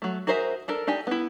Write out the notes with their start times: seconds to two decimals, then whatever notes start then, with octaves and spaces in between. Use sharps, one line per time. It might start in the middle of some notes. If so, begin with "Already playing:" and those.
0.02 F#3 A3
0.27 F#4 G#4 A#4 C5 E5
0.68 D4 A4 A#4
0.87 D4 D#4 G4 G#5
1.07 B3 E4